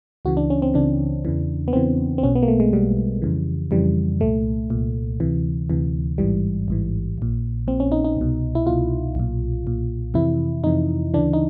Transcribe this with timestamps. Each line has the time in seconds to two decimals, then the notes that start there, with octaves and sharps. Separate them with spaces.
0.25 C#2 C#3 E3 F#4
0.37 D4
0.50 C#4
0.62 C4
0.74 C#2 C#3 E3 D4
1.25 E2 C#3 E3
1.68 B3
1.73 E2 C#3 E3 C4
2.18 C4
2.23 B1 B2 C#4
2.35 B3
2.43 A#3
2.48 A3
2.60 G#3
2.73 B1 B2 G3
3.22 F2 C#3 E3
3.71 F2 C#3 E3 G3
4.20 C2 A#2 A3
4.70 C2 A#2
5.20 D2 C3 E3
5.70 D2 C3 E3
6.18 A1 G#2 E3 G3
6.68 A1 G#2 E3
7.18 A#1 A#2
7.67 A#1 A#2 C4
7.80 C#4
7.92 D#4
8.04 D#4
8.17 C2 B2
8.55 E4
8.66 C2 B2 F4
9.15 B1 A#2
9.65 B1 A#2
10.14 F2 C3 E3 E4
10.64 F2 C3 E3 D#4
11.14 D2 C#3 E3 D4
11.33 D#4